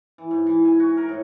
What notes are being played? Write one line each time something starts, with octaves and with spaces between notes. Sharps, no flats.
E3
G#2
E3
G#5
F#4
A#4
A2